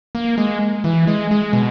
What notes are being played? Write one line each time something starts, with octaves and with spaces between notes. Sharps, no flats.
A#3
G#3
E3
G#3
G#3
B2